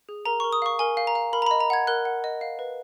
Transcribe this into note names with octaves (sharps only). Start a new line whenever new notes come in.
G#4
A#4 A#5
A#4 C#6
D#6
F5 C#6
A#4 G#5
F5
A#5
F5
A#4 B5
A#5
D#5 B5
A#5
F#5 G#6
A#4 F#6
F#5
D#5
F5
B4